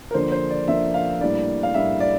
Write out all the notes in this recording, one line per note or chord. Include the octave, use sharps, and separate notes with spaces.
A#4
D3 F3 A#3 D4 C5
C5
D5
D3 F3 A#3 D4 E5
F5
A2 G3 A#3 D4 D5
F5
A2 G3 A#3 D4 E5
D5